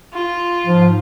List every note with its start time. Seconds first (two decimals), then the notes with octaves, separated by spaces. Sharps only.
0.13 F4
0.66 G#2 F3